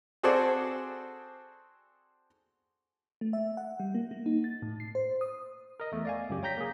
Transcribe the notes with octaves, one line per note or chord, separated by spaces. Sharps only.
C4 F#4 G#4 A4 C5 D5
A3
E5
F#5
G3
A#3
A#3
D#4
A6
A2
C7
C5
D#6
A#4 D#5
E2 A3
D5 F5 G#5
C#2 F#2 G4
C#5 G5 A#5 G6 A#6 B6
A#3 G#4